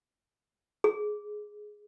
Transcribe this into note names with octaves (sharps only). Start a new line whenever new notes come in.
G#4